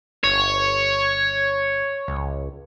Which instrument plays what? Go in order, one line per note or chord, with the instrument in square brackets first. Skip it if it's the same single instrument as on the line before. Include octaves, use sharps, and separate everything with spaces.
[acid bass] G1 [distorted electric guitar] C#5
[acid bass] C#2